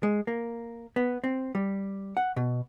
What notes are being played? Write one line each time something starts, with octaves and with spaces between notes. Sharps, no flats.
G#3
A#3
B3
C4
G3
F#5
B2